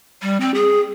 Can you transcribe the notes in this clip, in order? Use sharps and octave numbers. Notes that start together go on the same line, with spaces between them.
G3
C4
G#4